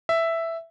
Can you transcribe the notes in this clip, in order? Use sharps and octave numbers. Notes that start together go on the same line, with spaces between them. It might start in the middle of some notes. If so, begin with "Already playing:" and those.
E5